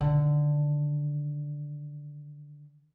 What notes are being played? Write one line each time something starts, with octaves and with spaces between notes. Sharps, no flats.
D3 D#3